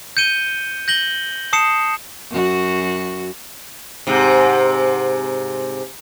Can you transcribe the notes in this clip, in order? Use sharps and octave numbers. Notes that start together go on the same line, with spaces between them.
G6 C#7 D#7 G7
G6 A#6 F#7 G7
A5 D#6 C7 C#7 E7
F#2 F#4
G#2 C3